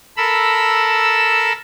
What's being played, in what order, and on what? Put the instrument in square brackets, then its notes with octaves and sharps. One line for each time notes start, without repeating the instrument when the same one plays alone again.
[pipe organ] A4 A#4 B5 E6